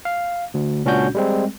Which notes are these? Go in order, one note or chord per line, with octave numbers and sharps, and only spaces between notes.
F5
D2
C#2 A#2 C#4 D4 F#4 G6
G3 G#3 C4